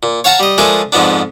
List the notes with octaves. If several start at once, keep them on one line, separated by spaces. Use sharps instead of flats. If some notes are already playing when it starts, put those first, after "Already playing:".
A#2
C#5 F5 F#5 A5 A#5 C#6
G3 D#5
F3 G#3 A3 D4 G#4 A#4
F2 G#2 F3 B3 D4